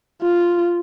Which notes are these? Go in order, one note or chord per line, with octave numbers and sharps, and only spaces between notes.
F4